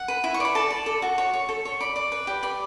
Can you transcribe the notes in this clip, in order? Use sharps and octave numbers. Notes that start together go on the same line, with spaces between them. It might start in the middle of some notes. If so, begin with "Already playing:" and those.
Already playing: F#5
B4
E4
C#6
D5 B5
A4 A5
D5
A4
F#4
C#5
C#5
A4
C#5
D5 B5
D5
B4
G4
D5 B5